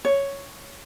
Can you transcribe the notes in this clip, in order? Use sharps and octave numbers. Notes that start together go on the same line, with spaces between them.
C#5